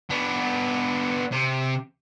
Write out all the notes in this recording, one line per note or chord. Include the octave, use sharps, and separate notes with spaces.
B3 D4
C3